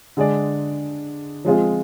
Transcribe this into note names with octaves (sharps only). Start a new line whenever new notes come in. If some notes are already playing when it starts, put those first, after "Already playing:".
D3 G#3 D4 G#4 D5
F3 G#3 C4 F4 G#4